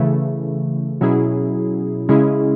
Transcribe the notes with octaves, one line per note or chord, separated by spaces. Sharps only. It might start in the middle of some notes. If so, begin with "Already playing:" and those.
Already playing: C#3 E3 A3
B2 F#3 C#4 E4 G#4
C#3 G#3 C#4 E4 G#4